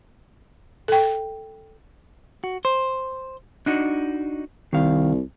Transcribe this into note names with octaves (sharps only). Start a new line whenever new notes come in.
A4 G5
F#4
C5
D4 D#4 F#4
C2 D#3 F5